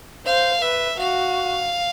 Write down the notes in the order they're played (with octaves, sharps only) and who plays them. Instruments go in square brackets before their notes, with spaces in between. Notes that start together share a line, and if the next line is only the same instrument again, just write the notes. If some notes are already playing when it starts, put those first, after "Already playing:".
[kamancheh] C5 [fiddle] F5
[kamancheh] B4 [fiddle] E5
[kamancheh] F#4 [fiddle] F5